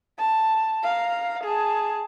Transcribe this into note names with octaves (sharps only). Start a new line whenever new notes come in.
A5
F5 A#5
G#4 A5